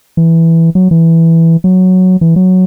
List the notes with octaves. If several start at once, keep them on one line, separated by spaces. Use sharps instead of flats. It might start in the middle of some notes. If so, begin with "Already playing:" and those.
E3
F#3
E3
F#3
E3
F#3